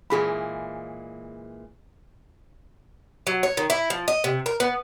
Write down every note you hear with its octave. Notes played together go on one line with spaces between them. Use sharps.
A#2 E3 G#3 G#4 B5
F#3
C#5
D#3
E4
F3
D#5
C3
A#4
B3